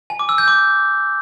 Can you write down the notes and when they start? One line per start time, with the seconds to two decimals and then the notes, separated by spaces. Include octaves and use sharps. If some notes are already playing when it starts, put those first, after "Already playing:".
0.10 G#5
0.19 D6
0.29 E6
0.38 G6
0.48 D6